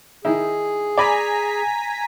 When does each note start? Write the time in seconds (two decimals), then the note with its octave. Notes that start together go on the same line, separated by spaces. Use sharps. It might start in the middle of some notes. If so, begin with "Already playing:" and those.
0.25 D#3 D#4 E4 G#4
0.98 D5 G#5 A#5 B5 D6 B6